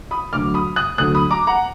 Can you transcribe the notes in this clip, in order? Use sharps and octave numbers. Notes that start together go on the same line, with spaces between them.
B5 D#6
D2 D3 F#3 D6 F6
B5 D#6
D#6 F#6
D2 D3 F#3 D#6 F#6
B5 D#6
A#5 D6
F#5 A#5